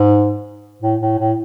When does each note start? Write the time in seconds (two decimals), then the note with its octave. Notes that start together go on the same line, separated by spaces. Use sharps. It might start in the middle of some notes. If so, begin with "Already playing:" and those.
Already playing: G#2
0.82 A2
1.01 A2
1.19 A2